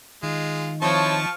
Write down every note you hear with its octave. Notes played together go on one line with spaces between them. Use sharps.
D#3 G#3 F4
F3 C4 E4 C#5 A5 C#6